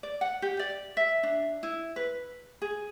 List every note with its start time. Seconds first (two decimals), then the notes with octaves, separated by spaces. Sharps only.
0.03 D5
0.21 F#5
0.42 G4
0.59 D5
0.97 E5
1.23 D4
1.63 E4
1.96 B4
2.62 G#4